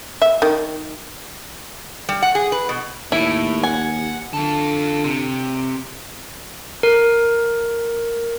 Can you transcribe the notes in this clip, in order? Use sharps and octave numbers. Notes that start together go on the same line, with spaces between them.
E5
D#3
G3
F#5
G#4
B4
B2
D#2 A2 E4
F#5 G#5
D3 F4 A4
C3
A#4